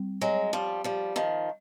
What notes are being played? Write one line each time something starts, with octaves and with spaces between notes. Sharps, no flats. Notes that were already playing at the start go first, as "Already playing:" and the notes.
Already playing: G3 C4
F#3 G#3
F3 G3
F3 G3
D#3 F3